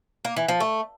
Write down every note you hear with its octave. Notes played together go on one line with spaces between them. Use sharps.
A#3
E3
F3
A3